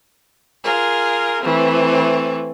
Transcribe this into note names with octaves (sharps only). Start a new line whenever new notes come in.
F4 G#4 A#4
E3 A3 C4